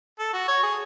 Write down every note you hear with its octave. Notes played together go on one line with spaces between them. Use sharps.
A4
F#4
C#5
G#4